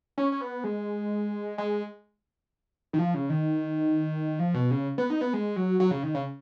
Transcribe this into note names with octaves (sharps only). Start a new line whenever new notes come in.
C#4
C#4
B3
G#3
G#3
D#3
F3
C#3
D#3
F3
B2
C#3
B3
D#4
B3
G#3
F#3
F#3
C#3
D#3
C#3